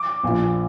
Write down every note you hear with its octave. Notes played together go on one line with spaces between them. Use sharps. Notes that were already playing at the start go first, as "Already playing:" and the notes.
Already playing: D6
A#1 A#2 F3